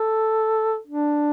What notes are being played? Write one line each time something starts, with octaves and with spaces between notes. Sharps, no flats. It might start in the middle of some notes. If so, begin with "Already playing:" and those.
Already playing: A4
D4